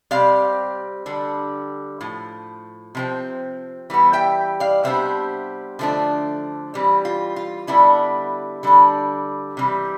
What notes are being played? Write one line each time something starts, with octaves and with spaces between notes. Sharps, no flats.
C3 G3 C4 D5 F5
D3 G3 D4
A2 F3
C3 F3 C4
E3 G3 B3
E5 G5
D5 F5
C3 G3 B3 D4 C5 E5
D3 F3 A3 D4
E3 G3 C4
F4
F4
D3 G3 B3 D4 E4
D3 G3 D4
C3 E3 G3